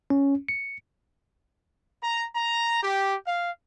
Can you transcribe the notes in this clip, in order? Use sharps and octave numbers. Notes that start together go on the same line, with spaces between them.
C#4
C#7
A#5
A#5
G4
F5